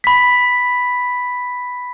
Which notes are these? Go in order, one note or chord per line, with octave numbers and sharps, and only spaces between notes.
B5 B6